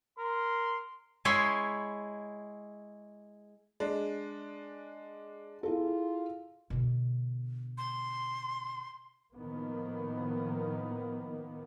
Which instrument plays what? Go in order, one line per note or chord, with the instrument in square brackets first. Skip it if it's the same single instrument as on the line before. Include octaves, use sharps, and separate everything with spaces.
[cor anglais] A#4 [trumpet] C6
[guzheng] G#3 E4 C#5 B5 C6
[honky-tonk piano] G#3 D4
[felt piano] E4 G#4 A4 [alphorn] F4
[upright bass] B2 D3
[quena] C6
[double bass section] A2 D#3 F3 A#3 B3